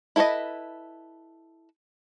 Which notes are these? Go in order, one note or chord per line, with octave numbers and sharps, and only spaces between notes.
E4 A4 B4 C#5 D#5